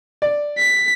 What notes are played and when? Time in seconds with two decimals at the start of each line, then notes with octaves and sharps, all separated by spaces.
0.22 D5
0.59 B6